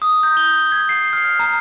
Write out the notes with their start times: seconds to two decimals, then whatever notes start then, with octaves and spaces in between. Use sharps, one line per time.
0.02 D#6
0.23 G6
0.37 G7
0.72 G#6
0.89 C7
1.13 F6
1.39 A#5